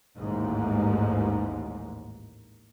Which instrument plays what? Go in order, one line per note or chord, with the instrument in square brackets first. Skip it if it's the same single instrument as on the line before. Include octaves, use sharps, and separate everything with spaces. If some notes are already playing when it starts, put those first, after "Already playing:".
[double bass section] A1 D#2 G#2